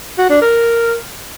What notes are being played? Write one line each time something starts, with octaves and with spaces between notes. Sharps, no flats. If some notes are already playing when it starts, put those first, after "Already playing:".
F#4
D4
A#4